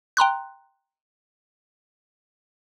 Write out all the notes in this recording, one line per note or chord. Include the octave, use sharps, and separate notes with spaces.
G5 A#5 C6 F#6